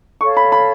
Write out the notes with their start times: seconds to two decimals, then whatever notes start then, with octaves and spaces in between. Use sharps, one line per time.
0.21 A4 C#5 F5 A5 C#6
0.37 B5
0.52 B5